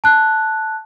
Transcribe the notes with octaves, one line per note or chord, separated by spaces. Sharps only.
A5 F#6